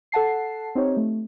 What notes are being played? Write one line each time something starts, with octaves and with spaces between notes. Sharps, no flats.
A4 F#5 A5 C7
C4 D#4 G4 C#5
A3